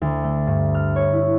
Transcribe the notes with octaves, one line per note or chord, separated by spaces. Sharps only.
D2
A3
G2
F6
C#5
E4